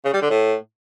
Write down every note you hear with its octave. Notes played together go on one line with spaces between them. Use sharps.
C#3
G3
D3
A2